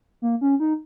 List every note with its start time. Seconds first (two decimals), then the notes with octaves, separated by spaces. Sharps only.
0.22 A#3
0.41 C#4
0.60 D#4